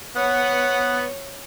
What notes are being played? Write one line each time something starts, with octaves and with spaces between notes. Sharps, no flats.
B3 C#5 F#5